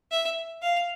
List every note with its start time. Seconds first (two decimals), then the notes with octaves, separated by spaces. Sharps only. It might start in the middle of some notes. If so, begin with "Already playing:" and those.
0.12 E5
0.62 F5